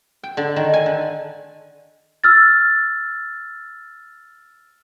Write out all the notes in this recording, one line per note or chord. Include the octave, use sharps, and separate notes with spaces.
G5
D3
D#3
G#5
D3
E6 F6 A6